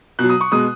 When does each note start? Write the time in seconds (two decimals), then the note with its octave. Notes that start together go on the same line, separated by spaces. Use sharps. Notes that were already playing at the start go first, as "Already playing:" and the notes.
0.19 B2 F#3 F#6
0.29 D#6
0.41 C#6
0.52 B2 G#3 D#6